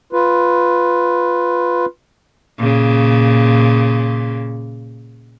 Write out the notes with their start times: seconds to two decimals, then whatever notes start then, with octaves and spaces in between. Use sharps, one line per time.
0.13 F4 B4
2.59 A#2 C#3